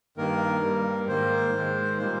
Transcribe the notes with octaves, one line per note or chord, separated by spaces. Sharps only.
G2 D#3 A#3 A#4
G2 G3 A#3
G#2 D#3 A#3 C5
G#2 D#3 G#3
A#2 G3 A#3 C5